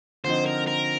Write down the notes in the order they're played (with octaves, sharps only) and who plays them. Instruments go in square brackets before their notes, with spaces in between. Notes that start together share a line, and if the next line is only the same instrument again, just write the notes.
[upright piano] D3 F3 C4 D#4 [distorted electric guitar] C5
[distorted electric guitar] A#4
A#4